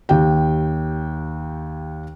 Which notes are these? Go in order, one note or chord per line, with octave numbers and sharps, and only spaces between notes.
D#2 G4 G5